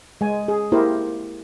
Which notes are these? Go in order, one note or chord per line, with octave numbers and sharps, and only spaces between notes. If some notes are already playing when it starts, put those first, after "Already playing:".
G#3 G#5
G#4
A#3 E4 G4 A#4 C5